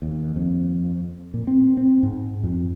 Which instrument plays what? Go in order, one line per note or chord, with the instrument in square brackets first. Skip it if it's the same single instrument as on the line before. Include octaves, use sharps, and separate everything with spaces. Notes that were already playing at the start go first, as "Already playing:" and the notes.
[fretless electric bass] D#2
F2
A#2
C4
C4
G#2
F2